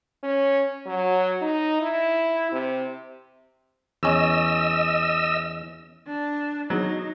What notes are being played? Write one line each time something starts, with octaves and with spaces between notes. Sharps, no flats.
C#4
F#3
D#4
E4
C3
E2 C#4 D#5 E6
D4
F#3 D#4